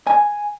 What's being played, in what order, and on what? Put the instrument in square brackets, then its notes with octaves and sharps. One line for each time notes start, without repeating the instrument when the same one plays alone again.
[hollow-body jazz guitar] G#5